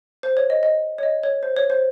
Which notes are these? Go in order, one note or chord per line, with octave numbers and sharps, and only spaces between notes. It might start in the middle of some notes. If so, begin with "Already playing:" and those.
C5
C#5
D#5
D#5
C#5
D#5
C#5
C5
C#5
C5